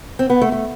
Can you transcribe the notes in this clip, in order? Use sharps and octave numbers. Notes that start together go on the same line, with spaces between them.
C4
B3
A3
A3